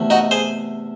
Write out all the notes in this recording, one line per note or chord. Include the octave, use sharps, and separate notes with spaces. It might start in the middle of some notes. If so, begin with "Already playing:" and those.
Already playing: E2 C3 A3
D#4 F#4
G#4 C5